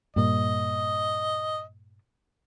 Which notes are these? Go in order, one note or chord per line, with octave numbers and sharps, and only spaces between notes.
G2 A#2 D#5